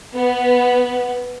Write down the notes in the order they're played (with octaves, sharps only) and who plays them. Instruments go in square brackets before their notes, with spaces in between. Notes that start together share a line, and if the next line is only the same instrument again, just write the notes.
[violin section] B3